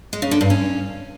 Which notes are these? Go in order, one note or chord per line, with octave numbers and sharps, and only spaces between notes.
G#3
C#3
D3
G2
C#4